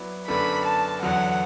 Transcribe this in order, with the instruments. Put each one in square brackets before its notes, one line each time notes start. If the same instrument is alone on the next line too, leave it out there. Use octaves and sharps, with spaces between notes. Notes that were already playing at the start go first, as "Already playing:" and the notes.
Already playing: [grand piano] F#3 B3 E4 D5
[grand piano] F#2 D3 B3 D4 A4 [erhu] B5
[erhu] A5
[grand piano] E2 D3 F#3 [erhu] F#5